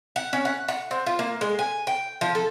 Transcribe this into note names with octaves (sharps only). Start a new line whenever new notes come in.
F#5
C#4
F#5
F#5
C4
F4
A#3
G#3
G#5
G5
F3
A4